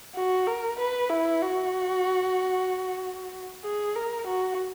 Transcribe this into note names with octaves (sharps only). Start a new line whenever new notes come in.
F#4
A#4
B4
E4
F#4
G#4
A#4
F#4